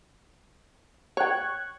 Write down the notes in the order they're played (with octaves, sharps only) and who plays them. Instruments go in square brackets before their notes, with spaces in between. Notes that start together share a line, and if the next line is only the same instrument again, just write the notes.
[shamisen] C#5 G5 [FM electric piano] C#6 F#6 G#6